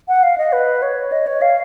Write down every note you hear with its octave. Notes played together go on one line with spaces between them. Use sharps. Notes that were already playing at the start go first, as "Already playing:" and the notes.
F#5
F5
D#5
B4
C#5
D#5
C#5
F5